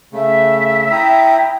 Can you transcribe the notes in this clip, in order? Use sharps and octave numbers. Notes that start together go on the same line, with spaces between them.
C#3 A3 E5
E4 G5 A#5 D#6